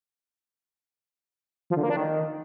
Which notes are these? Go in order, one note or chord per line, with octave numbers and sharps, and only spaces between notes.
F3
D3
A#3
D4
D#3